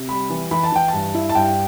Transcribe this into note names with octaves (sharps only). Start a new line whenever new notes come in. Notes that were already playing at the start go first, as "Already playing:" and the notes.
Already playing: C3
G3 B5
E3
E3 B5
A5
E3 G5
A5
G2
E4
A5
G2 G5